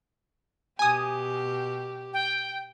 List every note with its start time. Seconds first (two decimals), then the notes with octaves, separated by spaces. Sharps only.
0.79 B2 G4 G#5 D#6
2.14 G5